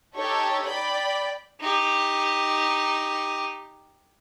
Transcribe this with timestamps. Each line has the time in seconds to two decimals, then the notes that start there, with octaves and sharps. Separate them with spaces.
0.14 D#4 G4 A4 C#5
0.67 D5 G5 B5
1.60 D#4 G4